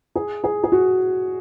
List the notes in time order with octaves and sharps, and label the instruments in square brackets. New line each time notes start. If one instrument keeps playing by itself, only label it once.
[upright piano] G#4
G#4
G#4
F#4